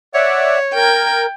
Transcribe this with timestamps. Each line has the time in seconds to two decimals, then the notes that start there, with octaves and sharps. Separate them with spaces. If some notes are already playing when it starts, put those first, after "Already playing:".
0.14 C#5 D5 E5 F#5
0.75 A#4 G5 G#6